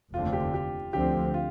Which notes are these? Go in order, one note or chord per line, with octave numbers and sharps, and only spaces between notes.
F1 D#2 D3 A3 C4 F4
G4
G4
D2 D3 F3 C4 G4
F4